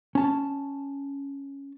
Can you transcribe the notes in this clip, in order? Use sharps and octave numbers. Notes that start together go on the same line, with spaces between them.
C#4 A5